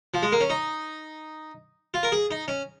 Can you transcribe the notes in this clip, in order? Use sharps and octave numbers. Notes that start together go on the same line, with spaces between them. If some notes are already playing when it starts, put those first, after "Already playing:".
F3
G#3
A#3
C#4
D#4
F4
A#4
G#4
D#4
C#4